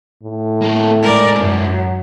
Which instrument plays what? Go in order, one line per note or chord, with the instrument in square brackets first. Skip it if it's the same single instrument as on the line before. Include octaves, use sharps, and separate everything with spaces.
[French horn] A2
[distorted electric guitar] A#3 A4
[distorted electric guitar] G#2 A4 [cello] A#4 D5
[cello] F#2
[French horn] F#3